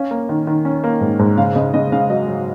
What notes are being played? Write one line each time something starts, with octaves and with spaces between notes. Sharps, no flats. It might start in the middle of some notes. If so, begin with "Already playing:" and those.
Already playing: C#4 F5
A#3
D#3
D#3
C#4
A#3
G#2
G#2
C#3 F5
C#3 D#5
C#3 D#5
C#3 F5
F#3 D#5
F#3